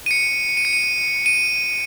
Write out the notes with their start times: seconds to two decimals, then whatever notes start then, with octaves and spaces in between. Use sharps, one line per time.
0.06 D#7
0.11 C#7
0.57 D#7
0.65 C#7
0.73 D#7
1.26 D#7